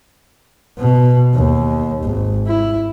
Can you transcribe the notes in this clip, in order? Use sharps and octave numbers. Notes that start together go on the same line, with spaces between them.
B2
D#2
G#1
E4